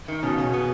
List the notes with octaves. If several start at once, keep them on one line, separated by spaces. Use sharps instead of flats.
D#3
B2 C#4
C#3 C#4
B2
B3